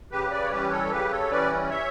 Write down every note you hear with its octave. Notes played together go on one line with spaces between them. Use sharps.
C#3 G4 B4
B4 D5
C#5
E3 G3 C#4 G4 B4
A4 C#5
C#3 G4 B4
A4 C#5
E3 G3 C#4 B4 D5
C#5 E5